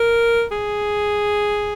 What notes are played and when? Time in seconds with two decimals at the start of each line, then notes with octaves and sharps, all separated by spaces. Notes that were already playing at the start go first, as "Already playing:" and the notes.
Already playing: A#4
0.51 G#4